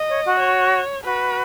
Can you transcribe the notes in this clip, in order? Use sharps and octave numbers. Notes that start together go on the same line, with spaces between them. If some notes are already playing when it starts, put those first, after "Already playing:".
Already playing: D#5
C#5
F#4
C#5
F#4 B4